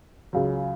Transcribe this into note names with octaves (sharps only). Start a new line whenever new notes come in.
C#2 C#3 F#3